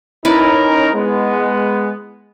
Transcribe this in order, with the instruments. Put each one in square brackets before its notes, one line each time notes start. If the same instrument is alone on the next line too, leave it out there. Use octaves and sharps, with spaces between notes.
[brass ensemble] C#4 D#4 A#4 [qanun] E4 B4 D5
[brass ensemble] G#3 B3